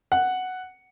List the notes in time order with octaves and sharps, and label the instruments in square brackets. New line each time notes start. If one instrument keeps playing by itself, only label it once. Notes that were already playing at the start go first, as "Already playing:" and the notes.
[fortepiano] F#5